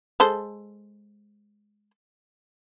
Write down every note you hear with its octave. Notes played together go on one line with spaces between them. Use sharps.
G#3 A4 C5